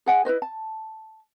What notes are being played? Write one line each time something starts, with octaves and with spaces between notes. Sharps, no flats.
G#4 F#5 G#5
E4 B4 C5 D#5
A5